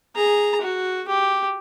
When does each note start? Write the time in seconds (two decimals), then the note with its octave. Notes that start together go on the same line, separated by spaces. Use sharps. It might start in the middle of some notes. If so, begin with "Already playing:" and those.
0.16 G#4 A#5
0.61 F#4
1.08 G4